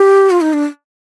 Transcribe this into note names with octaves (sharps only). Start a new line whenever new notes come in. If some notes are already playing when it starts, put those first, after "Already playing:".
Already playing: G4
F4
D#4
D4